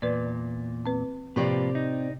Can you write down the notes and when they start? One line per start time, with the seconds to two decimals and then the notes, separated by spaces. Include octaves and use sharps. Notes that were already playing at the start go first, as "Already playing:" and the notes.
0.02 E2 A#2 B4 D5
0.86 C4 B4
1.36 A2 C3 F3 A#3 C4 G4 B4 D5
1.75 D#4